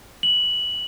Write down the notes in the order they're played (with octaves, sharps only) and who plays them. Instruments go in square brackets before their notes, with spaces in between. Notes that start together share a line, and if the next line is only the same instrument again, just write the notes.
[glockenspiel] F#7